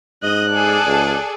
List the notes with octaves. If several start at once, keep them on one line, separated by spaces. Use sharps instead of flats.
G#2 D#5 F#6
G#4 A4 D5
C#2